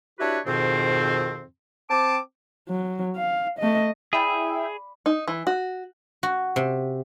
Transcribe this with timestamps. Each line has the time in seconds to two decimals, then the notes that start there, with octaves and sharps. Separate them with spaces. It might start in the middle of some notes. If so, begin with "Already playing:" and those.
0.20 D4 E4 F#4 G4 B4 C#5
0.46 F2 G#2 B2 D#3 C4
1.90 C4 A5 D6
2.68 F#3
3.17 F5
3.59 A3 D#5
4.13 E4 G#4 D5 E5 G5 B5 A6
5.06 D#4
5.28 E3
5.47 F#4
6.23 F#4
6.56 C3